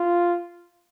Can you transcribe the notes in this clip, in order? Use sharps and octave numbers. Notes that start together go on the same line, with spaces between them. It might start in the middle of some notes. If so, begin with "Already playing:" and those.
Already playing: F4